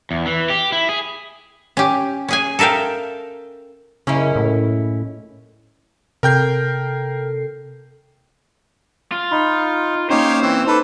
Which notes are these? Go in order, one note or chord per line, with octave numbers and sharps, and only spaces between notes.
E2
E3
G4
E4
G#4
C#4 G4
C#4 G#4 G#5
A4 A#4 E5 F5 G5
F#2 C#3 G#3 A#3 C#4 E4
A2
C3 A4 A#4 G5 G6 C7
F4
D#4 B5
A#3 C#4 D#4 G4 C5 C#5 F5
E3 C4
D#4 A4 B4 D6